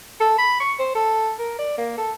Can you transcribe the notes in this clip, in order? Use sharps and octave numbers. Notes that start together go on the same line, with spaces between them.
A4
B5
C#6
C5
A4
A#4
D5
A#3
A4